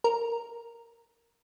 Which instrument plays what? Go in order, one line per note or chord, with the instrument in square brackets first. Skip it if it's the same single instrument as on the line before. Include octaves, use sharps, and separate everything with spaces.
[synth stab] A#4